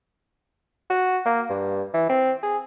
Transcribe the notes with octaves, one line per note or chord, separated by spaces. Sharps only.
F#4
A#3
G2
E3
C4
G#4